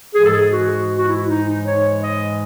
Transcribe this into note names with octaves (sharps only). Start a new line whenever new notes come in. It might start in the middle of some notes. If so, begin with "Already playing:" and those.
G#2 E3 G#3 G#4
A4
G#4
F#4
F#4
E4
D#4
D#4
C#5
D#5